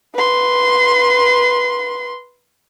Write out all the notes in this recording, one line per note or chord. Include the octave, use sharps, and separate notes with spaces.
B4 C6